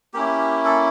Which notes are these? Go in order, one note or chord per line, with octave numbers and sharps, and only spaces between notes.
A#3 C#4 E4 G4
A4